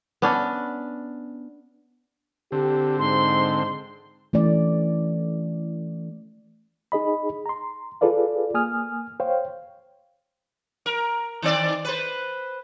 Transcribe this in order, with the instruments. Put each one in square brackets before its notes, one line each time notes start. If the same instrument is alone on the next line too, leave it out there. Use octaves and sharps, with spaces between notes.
[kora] B3 C#4 D4
[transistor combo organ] D3 C4 [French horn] G4
[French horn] G#2 [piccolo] C6
[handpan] E3 A3 C#4 D5
[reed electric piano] D#4 G#4 D#5 B5
A#5 C6
F4 G#4 A4 B4 D5 F5
A#3 G#5 D#6 F6
C5 C#5 F5 G5
[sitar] A#4
D#3 C4 D5
B4 C5